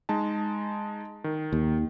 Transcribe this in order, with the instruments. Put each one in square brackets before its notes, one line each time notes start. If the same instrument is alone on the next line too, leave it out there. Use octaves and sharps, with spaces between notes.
[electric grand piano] G#3 D#4 A5
D#3
[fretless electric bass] D#2